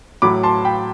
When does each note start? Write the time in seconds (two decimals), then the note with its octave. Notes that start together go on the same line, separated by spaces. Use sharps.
0.22 A2 F#3 B5 D6
0.43 A5 C6
0.65 G5 B5